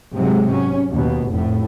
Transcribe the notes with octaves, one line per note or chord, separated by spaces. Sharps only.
G#2 C3 F#3 G#3
C#4
D#2 B2
F1 A2